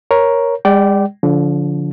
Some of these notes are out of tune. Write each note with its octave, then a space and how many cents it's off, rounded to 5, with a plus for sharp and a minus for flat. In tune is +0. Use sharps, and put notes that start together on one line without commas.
A#4 +10 C#5 +0
G#3 -45 D5 +0 G5 -30
D3 -35 F3 +0